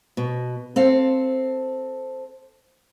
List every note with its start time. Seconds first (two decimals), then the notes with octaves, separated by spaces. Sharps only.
0.17 B2
0.76 C4 A4 F5